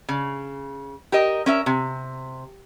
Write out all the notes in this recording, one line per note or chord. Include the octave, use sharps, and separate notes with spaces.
C#3
G4 A#4 D#5
C#4 A#4 E5
C3